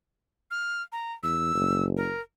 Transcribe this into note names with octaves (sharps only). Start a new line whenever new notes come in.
F6
A#5
E2 E6
F#1
A#4